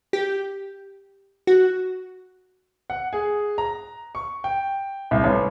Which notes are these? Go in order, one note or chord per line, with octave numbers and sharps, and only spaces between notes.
G4
F#4
F#5
G#4
A#5
C#6
G5
C2
A1